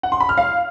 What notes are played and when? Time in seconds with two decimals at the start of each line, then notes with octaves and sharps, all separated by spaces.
0.03 F#5
0.12 C6
0.20 B5
0.29 F6
0.38 F5